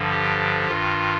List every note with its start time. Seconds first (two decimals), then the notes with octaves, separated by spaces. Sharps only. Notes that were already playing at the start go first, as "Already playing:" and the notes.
Already playing: G2 D3 F3
0.11 G4
0.68 G2 D#3 F4